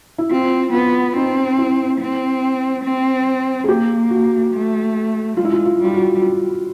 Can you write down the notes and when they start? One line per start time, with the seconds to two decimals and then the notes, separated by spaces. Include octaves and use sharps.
0.18 E4
0.31 C4 F4
0.73 B3 F4
1.15 C4 D#4
1.58 E4
2.00 C4
2.84 C4
3.64 G#4
3.68 A#3 G4
4.10 F#4
4.53 A3
5.37 G#3 F4
5.45 E4
5.53 F4
5.65 F4
5.80 G3 F4
5.94 F#4
6.22 F4